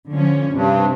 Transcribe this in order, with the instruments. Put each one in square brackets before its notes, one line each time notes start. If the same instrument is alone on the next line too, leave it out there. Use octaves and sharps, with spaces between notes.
[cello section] D3 F3 C#4
[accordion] G2 [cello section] C3 C4